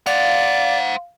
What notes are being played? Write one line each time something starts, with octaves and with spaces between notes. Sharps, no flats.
C5 D5 F5 F#5